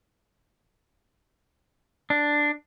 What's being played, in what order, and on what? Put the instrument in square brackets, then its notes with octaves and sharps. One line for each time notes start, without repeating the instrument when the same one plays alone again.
[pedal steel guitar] D4